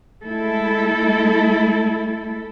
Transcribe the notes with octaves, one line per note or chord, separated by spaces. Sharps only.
G#3 A3 E4 A4